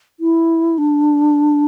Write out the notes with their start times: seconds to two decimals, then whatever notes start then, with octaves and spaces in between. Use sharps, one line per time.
0.20 E4
0.78 D4